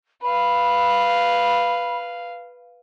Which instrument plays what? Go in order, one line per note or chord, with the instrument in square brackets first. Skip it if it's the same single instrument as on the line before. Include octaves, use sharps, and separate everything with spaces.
[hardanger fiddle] B4 F5 [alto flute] B5